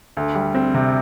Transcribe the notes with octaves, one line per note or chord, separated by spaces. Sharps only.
D2
G3
C4
C3